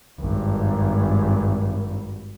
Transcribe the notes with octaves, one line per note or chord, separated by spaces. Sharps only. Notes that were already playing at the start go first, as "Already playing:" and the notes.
G#1 G2